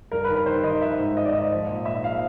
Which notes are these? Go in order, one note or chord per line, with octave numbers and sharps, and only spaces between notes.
G2 A#4
B4
D#3
B4
D#3 C5
D#3 D#5
F3 E5
G#2
F3 D#5
D5
G#2 D#5
F3
A#2
A#2 E5
F3 F5